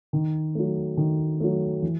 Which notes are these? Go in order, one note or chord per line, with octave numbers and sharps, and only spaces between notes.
D#3
F#3 A3
D#3
F#3 A3
E3